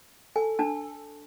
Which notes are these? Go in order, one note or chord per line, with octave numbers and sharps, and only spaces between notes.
A4 G#5
D4 A5